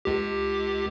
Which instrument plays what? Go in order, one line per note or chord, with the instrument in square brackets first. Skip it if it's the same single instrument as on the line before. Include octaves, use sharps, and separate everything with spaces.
[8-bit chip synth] C#2 G4